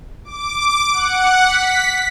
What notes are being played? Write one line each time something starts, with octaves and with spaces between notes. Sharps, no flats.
D6
F#5
B6